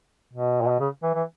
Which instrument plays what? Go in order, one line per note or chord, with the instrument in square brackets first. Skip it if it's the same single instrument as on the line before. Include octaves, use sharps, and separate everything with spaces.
[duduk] B2
A#2
B2
C#3
E3
E3